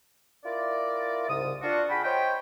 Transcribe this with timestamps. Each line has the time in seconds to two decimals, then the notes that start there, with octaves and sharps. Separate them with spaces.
0.45 E4 F4 A#4 D5
1.29 C2 G#2 C#3 D#6
1.62 D4 F4 F#4
1.90 G#4 F#5 G5 B5
2.04 C5 C#5 D#5 G5